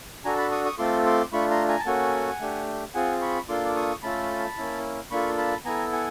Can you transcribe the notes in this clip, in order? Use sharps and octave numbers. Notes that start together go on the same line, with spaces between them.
D4 F#4 A4 G#5 A#5
A5 B5
C#6 D#6
C#6 D#6
A3 C4 F4 A4 C6 D6
C6 D6
A3 D4 F4 B5 C#6
A#5 C6
G#5 A#5
A5
A#3 C#4 F#4 A4 F#5 G#5
A3 D4 G4
C4 F4 G#4 F#5 G#5
B5 C#6
A#3 D4 F4 A4 C6 D6
D6
C#6 D#6
A3 C#4 F4 A4 A5 B5
A#3 C#4 E4
A#3 D4 F4 A4 B5 C#6
A5 B5
B3 E4 A4 G#5 A#5
F#5 G#5